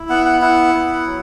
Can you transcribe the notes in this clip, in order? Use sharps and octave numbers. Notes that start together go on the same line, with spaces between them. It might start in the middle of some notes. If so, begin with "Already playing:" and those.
Already playing: E4
B3 F#5
F#5
E4 F#5
B3
F#3